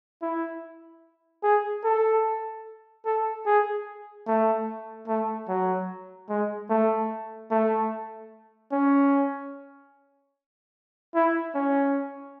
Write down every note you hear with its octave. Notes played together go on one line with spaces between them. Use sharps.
E4
G#4
A4
A4
G#4
A3
A3
F#3
G#3
A3
A3
C#4
E4
C#4